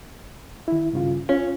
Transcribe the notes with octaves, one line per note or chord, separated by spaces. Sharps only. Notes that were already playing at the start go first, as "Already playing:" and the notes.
D#3 E4
G2 C#3 F4
C#4 F4